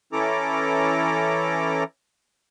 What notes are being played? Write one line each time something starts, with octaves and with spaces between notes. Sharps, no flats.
E3 C#4 E4 A4 A#5 D6